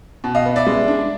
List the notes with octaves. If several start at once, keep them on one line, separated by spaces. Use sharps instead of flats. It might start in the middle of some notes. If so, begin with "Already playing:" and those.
B2
D#5 F5
B3
D5 E5
G#3
D4